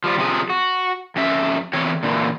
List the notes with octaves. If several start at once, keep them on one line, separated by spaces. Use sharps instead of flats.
F3 G3 F4
C3 F3 F#4 G#4
F#4
F2 C#4 E5
E2 E3 C4 C#5
A#2 D3 E3